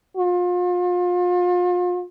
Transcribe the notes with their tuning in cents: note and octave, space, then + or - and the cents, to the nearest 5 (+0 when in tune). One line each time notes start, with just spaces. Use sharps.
F4 +35